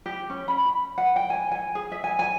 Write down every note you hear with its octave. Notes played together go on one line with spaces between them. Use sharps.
G4
C#4
B5
B5
F#5
G5
G#5
G#5
G#4
E5
G#5
G#5